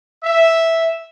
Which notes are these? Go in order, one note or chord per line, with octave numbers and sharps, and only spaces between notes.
E5